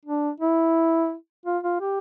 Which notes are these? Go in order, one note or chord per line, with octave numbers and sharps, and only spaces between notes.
D4
E4
F4
F4
G4